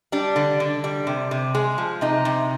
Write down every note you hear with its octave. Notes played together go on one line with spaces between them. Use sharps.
G3 D4
D3
D3
G3
C3
C3
G#3
F3
C3 D#4
C3